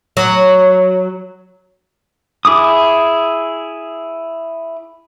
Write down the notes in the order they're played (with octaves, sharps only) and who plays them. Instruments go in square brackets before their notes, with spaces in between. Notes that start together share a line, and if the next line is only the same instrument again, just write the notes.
[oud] F#3
[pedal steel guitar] E4 G#4 D6 D#6